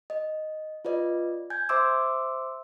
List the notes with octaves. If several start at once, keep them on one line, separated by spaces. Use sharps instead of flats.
D#5
F4 B4 D5 D#5
G#5 G6 G#6
C5 E5 C6 D6 E6